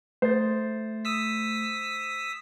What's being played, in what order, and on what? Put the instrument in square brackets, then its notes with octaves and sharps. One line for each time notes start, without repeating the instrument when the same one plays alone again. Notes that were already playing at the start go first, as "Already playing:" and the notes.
[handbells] A3 A6 [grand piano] C5
[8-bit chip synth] D#6 E6 B6